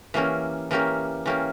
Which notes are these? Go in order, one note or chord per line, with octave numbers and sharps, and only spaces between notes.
E3 A#3 C#4 G4 A#4
E3 A#3 C#4 G4 A#4
E3 A#3 C#4 G4 A#4